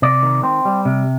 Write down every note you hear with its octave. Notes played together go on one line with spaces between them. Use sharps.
C3 D5
D#3
C4
G3
C3